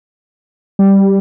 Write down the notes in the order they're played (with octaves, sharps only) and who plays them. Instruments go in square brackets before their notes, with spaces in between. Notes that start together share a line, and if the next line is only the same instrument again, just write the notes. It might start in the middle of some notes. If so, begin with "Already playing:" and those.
[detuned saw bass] G3